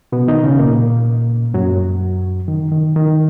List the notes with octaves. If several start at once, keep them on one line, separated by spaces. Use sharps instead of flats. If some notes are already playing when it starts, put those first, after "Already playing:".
B2 B3
D#3 D#4
C#3 C#4
A#2 A#3
F#2 F#3
D#3
D#3
D#3